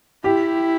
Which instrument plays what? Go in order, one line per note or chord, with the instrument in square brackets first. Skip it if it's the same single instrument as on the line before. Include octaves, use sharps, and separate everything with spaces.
[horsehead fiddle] E4 [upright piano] G4